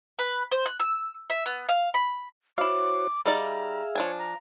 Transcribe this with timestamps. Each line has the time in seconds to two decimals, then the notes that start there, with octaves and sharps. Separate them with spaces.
0.19 B4
0.52 C5
0.66 F#6
0.80 E6
1.30 E5
1.46 B3
1.69 F5
1.94 B5
2.58 E4 F#4 C5 C#5 F5 D6
3.26 G3 D#4 G#4 D5 E5 F5 A#5
3.95 F3 D4 C#5 G#5
4.19 A#5